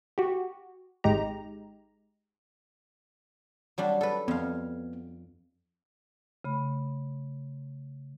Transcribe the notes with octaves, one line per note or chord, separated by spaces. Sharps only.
F#4 G4
G#1 G#3 D#4 G4 A#5
F#3 G3 D4
A4 B4
F2 B3 F5
C#3 A3 B5